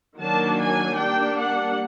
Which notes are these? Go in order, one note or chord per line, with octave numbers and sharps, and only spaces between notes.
D#3 F#3 A#3 D4 A5
G#5
G3 A#3 D4 G5
F#5